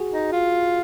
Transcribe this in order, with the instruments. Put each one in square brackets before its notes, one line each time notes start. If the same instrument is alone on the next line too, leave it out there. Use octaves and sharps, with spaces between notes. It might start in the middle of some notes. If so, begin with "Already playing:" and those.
Already playing: [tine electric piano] F#4 G#4
[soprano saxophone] D#4
F4